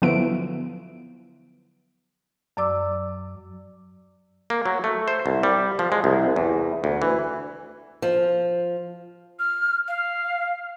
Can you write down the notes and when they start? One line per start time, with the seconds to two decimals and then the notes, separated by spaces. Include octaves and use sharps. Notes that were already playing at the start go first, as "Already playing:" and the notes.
0.02 D3 F3 F#3 B3 E4 D7
2.57 F#2 F#3 D5 D6 E6
4.50 A#3
4.66 F#3
4.84 A3
5.08 C5
5.26 C2
5.43 G3
5.79 F3
5.92 G#3
6.04 C2
6.36 E2
6.84 D2
7.02 E3
8.02 F3
9.39 F6
9.88 F5